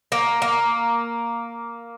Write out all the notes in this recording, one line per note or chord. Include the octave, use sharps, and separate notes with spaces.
A#3
A#3